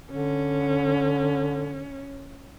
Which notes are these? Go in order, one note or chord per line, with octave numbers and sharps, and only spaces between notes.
D3 C#4